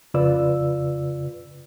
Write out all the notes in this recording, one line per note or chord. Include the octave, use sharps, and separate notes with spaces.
F2 C#3 F4 B4 D5 E6